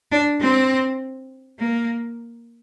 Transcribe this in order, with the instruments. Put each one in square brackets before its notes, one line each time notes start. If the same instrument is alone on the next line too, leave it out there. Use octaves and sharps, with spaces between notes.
[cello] D4
C4
A#3